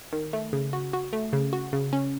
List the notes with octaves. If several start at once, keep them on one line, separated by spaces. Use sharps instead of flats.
D#3
A3
C#3
F#4
F#4
A3
C#3
F#4
C#3
C#4